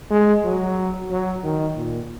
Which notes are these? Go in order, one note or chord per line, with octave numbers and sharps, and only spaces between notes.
G#3
F#3
F#3
D#3
A#2